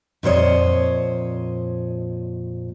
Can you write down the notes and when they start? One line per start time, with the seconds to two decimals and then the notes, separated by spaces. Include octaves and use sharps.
0.23 F2 A#2 C5 C#5 D#5